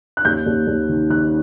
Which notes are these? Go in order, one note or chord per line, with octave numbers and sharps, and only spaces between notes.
F#6
D#2 G6
D#2
D#2
D#3
D#3 F#6